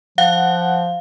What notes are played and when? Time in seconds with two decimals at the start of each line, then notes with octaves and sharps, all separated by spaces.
0.18 F3 F5 F#5